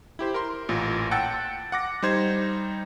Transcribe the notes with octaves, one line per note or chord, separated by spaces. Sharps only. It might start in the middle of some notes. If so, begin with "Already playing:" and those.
E4 G4 C5
A#4 C6
A1 A#2 F4
F#5 G5 A5 E6 A6 C#7
F#5 D6 A#6
G3 D#4 C5 G#6